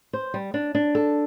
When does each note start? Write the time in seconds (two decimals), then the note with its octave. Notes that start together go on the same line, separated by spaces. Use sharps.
0.13 C5
0.34 G3
0.54 D4
0.75 D4
0.95 A4